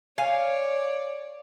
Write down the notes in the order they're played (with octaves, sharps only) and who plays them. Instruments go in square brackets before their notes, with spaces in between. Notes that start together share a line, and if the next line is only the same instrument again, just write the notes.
[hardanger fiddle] C#5 D5 [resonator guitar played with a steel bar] F5 G#5